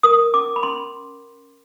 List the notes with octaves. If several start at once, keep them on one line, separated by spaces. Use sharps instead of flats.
A#4 D#6
C#4 D6
B5
C#4 C6